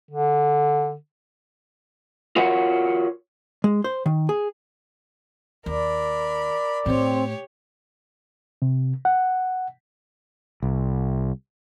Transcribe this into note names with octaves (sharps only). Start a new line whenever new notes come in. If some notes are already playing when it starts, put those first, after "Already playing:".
D3
F4 F#4 A#4 C#5 F#5
G#3
C5
D#3
G#4
D#2 A#4 D5 B5
A2 A3 C4 G4 C#5
C3
F#5
C2